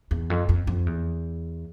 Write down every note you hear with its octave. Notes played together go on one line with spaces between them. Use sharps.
E2
F2
F2
F2
E2